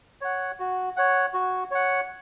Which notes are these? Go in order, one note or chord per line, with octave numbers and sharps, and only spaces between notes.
C#5 F#5
F#4
C#5 F#5
F#4
C#5 F#5